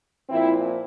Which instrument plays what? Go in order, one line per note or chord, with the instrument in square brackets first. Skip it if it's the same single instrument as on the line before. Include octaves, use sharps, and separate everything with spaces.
[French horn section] A#2 F3 C4 E4